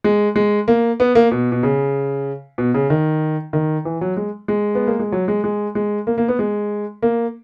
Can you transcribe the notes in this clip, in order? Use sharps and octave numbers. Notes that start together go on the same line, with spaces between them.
G#3
G#3
A#3
B3
A#3
B2
B2
C#3
B2
C#3
D#3
D#3
E3
F#3
G#3
G#3
B3
A#3
G#3
F#3
G#3
G#3
G#3
A#3
A#3
B3
G#3
A#3